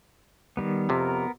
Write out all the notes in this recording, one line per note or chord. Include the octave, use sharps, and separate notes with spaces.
D#3 G3 B3
F2 C3 B3 A#4